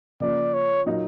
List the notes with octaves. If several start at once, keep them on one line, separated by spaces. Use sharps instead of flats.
C#3 F3 A#3 D5
C#5
A#2 F#3 A#3 D#4